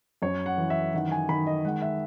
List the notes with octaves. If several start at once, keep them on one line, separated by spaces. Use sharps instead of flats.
F#2 C#5
F#5
E3
E5
D#3 F#5
G#5
D#3 B5
D#5
G#3 F#5
E5